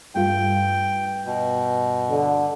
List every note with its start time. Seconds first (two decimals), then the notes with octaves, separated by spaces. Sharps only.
0.15 G2 A3 F4 G5
1.26 B2
2.10 D3